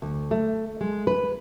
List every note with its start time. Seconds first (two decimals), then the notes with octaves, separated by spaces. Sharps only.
0.02 D2
0.31 A3
0.81 G#3
1.07 B4